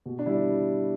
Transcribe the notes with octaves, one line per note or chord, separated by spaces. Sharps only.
B2
D4
G3 E4